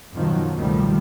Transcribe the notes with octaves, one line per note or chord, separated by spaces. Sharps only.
F#2 B2 D#3 F3 F#3
C#2 B2 D#3 F3 G3 A3